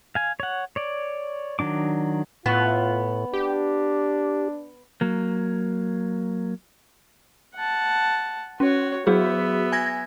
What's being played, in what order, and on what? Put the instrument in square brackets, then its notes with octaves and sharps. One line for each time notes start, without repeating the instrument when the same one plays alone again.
[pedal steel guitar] F5 G#5
C#5 F#5
C#5 D5
D#3 F#3 D4 D6
[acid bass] A2 [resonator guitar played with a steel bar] B3 [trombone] F4
[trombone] D4 [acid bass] G4
[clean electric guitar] F#3 A#3
[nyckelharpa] F#5 A5
[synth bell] C#4 [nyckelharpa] F#4 C#5
[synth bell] F#3 F#4 G#4 [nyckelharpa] B3 E5
[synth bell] G#5 G#6 A#6